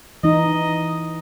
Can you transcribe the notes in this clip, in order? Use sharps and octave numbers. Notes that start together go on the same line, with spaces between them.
E3 D#4 D#5